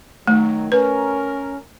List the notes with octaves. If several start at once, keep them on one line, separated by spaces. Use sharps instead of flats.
D#3 F#3 A3
C#4 A#4 B4